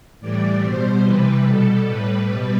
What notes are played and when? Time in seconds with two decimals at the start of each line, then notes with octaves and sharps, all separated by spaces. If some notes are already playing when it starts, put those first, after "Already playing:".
0.20 A2 E3 G3 D5
0.61 B2 G3 C5
1.03 C3 E3 G3 B4
1.44 B2 G3 A4
1.86 A2 G3 B4
2.27 B2 G3 B4